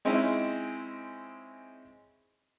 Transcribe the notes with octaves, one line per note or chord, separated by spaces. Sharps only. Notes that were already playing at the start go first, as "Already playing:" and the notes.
G#3 C4 C#4 D#4 E4 G#4